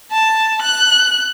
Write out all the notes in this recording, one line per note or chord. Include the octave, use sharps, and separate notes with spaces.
A5
F#6